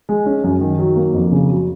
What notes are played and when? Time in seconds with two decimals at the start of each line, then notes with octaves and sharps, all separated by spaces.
0.09 G#3
0.26 C#4
0.44 F#2
0.61 D#3
0.79 F#3
0.96 A#3
1.13 F2
1.31 C#3
1.49 F#3